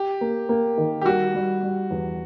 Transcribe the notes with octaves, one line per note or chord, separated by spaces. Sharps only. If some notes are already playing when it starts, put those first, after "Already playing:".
Already playing: G4
A#3
A#3
D#3
G4
G3 F#4
G3
G3
E2